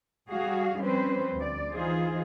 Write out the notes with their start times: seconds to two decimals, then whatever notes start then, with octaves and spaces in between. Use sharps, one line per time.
0.28 G3 F#4 G#4 F5
0.80 F3 G3 C4 C#4 B4 C5
1.36 D2 D5
1.73 E3 D#4 F4 G#4 C5